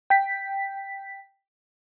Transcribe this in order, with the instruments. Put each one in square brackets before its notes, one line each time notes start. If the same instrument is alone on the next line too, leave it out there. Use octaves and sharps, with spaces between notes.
[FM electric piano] G5 B6